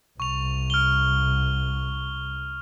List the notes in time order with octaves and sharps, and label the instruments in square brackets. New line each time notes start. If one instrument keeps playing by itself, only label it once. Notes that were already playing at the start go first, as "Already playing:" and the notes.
[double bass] C2 [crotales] C#6 F7
[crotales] F6 G7